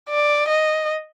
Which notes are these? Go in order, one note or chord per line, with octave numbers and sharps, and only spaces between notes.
D5
D#5